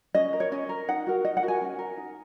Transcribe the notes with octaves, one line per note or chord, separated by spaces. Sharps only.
C#4 D#5
A#4
C#5
C#4 D#5
A#4
D#4 F#5
F#4 A#4
D#4 D#5
F#5
F#4 A#4
G#5
C#4
A#4
D#4